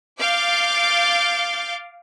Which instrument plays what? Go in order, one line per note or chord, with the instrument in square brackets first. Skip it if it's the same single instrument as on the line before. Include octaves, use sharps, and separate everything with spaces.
[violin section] F5 D6 G6 A6